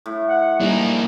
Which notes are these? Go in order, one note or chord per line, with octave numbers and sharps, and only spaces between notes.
A2
F#5
G3 A#3 D4 D#4 F7